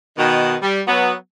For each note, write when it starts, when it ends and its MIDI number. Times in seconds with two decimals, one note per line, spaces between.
0.18 0.56 47
0.18 0.56 51
0.62 0.81 55
0.87 1.13 54
0.87 1.13 59